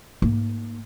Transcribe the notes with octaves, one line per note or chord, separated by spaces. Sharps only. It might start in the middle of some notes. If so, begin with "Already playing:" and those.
G#2 A#3